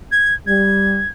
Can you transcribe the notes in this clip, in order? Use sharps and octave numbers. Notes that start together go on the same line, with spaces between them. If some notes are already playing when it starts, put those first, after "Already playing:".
G#6
G3 G#6